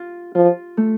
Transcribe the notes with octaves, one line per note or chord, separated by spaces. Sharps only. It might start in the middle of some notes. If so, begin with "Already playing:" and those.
Already playing: F4
F3 F4
A3